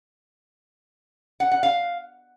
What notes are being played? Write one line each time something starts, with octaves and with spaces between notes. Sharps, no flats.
F#5
F#5
F5